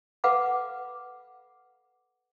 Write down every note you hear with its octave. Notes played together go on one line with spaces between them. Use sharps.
A4 B4 F5 F#5 B5 D6